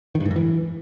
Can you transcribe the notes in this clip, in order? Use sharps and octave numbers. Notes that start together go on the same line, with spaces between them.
D#3
G2
G#2
F#2
E3